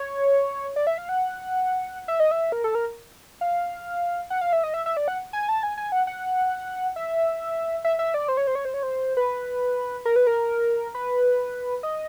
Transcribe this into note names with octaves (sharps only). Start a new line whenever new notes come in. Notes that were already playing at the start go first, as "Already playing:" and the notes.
Already playing: C#5
D5
E5
F5
F#5
E5
D#5
E5
A#4
A4
A#4
F5
F#5
F5
E5
D#5
E5
E5
D5
F#5
G#5
A5
G#5
G#5
F#5
F#5
E5
E5
E5
D5
C5
C#5
C5
C#5
C5
C#5
C5
B4
A#4
B4
A#4
B4
D#5